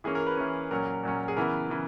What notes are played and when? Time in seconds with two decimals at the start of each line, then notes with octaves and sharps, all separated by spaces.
0.04 E3 A#3 C#4 G#4
0.15 A#4
0.27 B4
0.37 E3 A#3 C#4
0.71 A#2 F#3 C#4 A#4
1.03 A#2 F#3 C#4
1.28 G#4
1.37 C#3 E3 B3 A#4
1.70 C#3 E3